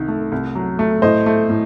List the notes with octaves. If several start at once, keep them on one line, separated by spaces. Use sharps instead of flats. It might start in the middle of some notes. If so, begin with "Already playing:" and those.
Already playing: C2 D#3
A3
C2
F#3
A3
A2 C5 D#5
A3
A2